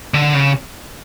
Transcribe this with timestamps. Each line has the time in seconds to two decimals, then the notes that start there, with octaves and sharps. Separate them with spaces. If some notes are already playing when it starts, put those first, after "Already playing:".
0.14 D3
0.35 C#3